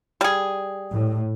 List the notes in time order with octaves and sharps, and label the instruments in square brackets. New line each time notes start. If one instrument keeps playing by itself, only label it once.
[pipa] G3 G#4
[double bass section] A2